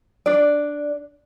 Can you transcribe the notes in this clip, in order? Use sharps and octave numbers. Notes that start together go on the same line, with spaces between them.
D4 D5